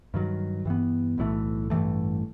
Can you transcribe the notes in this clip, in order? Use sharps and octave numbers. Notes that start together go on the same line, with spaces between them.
G2 D#3 F#3
G2 E3 B3
B1 A2 E3 A3
A1 G2 E3 A3